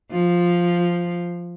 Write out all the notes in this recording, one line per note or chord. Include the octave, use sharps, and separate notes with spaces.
F3